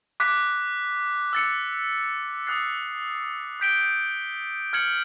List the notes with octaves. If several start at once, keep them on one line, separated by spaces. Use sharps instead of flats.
D6 F#6 B6
E6 A6 C#7
D#6 F#6 A6 C7
D6 G6 B6 D7 G7
F6 G#6 C#7 F#7